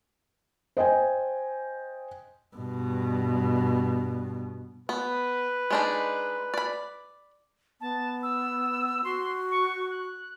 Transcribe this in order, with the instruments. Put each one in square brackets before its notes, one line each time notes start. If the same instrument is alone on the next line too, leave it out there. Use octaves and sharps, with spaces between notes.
[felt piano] C5 D#5 G5 G#5
[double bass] G2 B2
[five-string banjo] B3 [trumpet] B4
[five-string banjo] G#3 D4 D#4
D5 B5
[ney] B3 [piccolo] A5
[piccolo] E6
[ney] F#4 [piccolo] C6
[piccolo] C#6
F#6